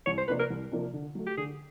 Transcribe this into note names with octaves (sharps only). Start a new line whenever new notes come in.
C2 C#5
C5
C3 F3 A#3 D4 B4
A#4
C2
C3 F3 A#3 D4
D3
F#3 A3
G4
D3 G#4